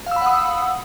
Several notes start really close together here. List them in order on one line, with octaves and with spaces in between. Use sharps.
F5 E6 B5 F#5 D#6